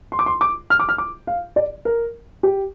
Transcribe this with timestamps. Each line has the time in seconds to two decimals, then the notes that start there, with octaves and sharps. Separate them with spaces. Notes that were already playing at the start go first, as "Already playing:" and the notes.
0.12 C6
0.19 D6
0.26 C6
0.41 D6
0.70 F6
0.80 D6
0.89 F6
0.98 D6
1.27 F5
1.56 D5
1.85 A#4
2.43 G4